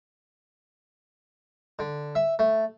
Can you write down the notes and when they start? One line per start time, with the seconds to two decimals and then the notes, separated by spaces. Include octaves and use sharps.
1.79 D3
2.15 E5
2.39 A3